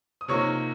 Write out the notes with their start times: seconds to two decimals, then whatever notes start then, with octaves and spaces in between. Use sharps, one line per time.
0.21 D#6
0.28 C3 F3 A#3 D#4 C#5 C#6